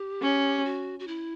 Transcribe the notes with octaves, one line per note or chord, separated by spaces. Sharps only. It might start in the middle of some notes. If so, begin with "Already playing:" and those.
Already playing: G4
C#4
F#4
F#4
E4